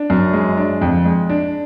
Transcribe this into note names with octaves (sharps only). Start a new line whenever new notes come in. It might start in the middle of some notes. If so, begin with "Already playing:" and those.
Already playing: D4
F#2
G#3
D4
F2
G#3
D4